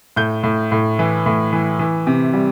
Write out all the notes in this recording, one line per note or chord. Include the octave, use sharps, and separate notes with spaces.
A2 G6
A2
A2
E3
A2
E3
E3
C3
G3